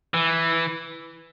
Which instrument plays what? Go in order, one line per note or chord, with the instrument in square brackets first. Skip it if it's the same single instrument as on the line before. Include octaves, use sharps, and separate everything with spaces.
[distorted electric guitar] E3